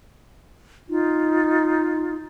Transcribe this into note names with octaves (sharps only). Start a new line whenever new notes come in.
D#4 F4